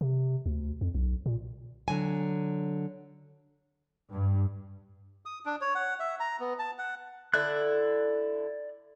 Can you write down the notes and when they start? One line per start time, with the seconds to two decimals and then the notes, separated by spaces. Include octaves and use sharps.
0.01 C3
0.46 D2
0.81 F2
0.95 B1
1.26 A#2
1.88 D3 F#3 G#5
4.12 G2
5.26 D#6
5.46 D4
5.61 C#5
5.75 F#5
6.00 E5
6.20 A#5
6.40 B3
6.59 A5
6.79 F#5
7.34 D3 E4 D5 F#6